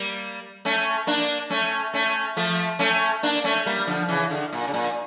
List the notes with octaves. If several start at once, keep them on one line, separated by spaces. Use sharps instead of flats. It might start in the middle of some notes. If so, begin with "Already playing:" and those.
Already playing: G3 A#3
A3 C#4
A#3 D4
A3 C#4
A3 C#4
F3 A3
A3 C#4
A#3 D4
A3 C#4
G3 A#3
D3 F3
C#3 E3
D3
A#2
C#3
A#2